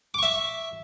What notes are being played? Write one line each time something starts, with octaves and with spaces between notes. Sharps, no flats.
E5 C#6 D6